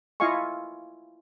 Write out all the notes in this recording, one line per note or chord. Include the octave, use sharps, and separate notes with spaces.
E4 F4 D#5 F5 G#5 C#6